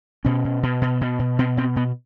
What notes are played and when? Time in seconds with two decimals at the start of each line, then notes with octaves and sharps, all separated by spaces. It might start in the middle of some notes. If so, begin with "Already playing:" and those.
0.25 B2 C#4
0.45 B2
0.63 B2
0.82 B2
1.01 B2
1.19 B2
1.39 B2 C4
1.57 B2 C4
1.76 B2 B3